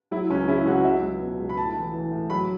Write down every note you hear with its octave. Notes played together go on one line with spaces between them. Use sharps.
F#3 E4
C#2 C#4
C#3 E4
C#2 F#4
F#3 E5
C#2
B2
C#2
B5
A2 A5
E3
E3
A2
F#3 B5